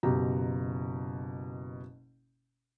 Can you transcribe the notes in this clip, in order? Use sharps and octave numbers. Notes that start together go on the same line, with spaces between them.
F#1 B2 G4 A#5